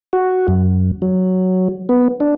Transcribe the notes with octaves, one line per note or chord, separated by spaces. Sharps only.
F#4
F#2
F#3
B3
D4